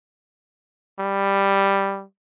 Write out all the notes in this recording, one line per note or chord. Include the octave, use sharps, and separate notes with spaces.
G3